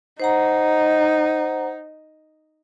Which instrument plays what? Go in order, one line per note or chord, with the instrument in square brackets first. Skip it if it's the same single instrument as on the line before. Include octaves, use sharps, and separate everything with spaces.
[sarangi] D#4 [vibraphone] C5 F#5 A#5